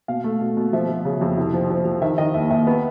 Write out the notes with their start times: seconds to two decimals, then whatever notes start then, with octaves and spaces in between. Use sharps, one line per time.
0.08 B2 F5
0.24 A3
0.41 B2
0.57 B2
0.73 F3 E5
0.89 F3
1.05 C#3
1.21 F2
1.37 C2
1.54 F3
1.70 F3
1.85 F3
2.02 D#3 E5
2.18 D#3 D#5
2.34 D#2 E5
2.50 D#2 E5
2.67 B3